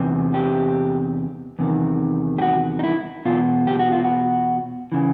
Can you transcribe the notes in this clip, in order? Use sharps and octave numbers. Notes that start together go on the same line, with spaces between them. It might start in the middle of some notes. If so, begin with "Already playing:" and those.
Already playing: E2 C3
G4
E2 C3 D#3
G4
F#4
D#4
E4
E2 B2 F4
G4
F#4
F4
F#4
C#3 E3